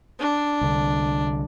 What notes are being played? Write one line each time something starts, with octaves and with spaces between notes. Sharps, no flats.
D4
C2 D3